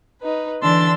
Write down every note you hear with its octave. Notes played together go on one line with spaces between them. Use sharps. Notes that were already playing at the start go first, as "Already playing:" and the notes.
D#4 B4
D3 E3 D4 C6 E6 A6